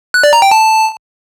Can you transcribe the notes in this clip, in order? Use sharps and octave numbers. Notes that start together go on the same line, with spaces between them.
F#6
D5
A#5
G5
A5